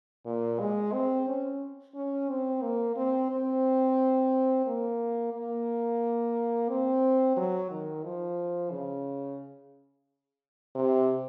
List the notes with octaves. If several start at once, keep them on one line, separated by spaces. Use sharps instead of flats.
A#2
G#3
C4
C#4
C#4
C4
A#3
C4
C4
A#3
A#3
C4
F#3
D#3
F3
C#3
C3